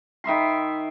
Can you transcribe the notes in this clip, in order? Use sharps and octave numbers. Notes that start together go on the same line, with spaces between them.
D#3 E5 B5 C6